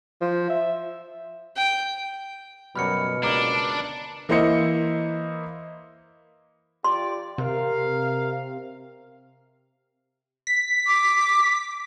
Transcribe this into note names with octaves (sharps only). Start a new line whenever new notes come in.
F3
E5
G5
F#2 B2 F#3 G3 B5 F6 C#7
C#2 A#3 D4 A#5 D6 G7
E3 A#3 E4 C5 D#5 C#7
F4 G4 D5 C6
C3 A#4 F5
B6
D6